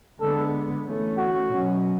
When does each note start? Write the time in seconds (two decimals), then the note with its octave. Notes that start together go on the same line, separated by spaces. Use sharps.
0.21 D3 G#3 B3 A4
0.85 E3 A3 C#4
1.18 F#4
1.49 B2 F#3 C#4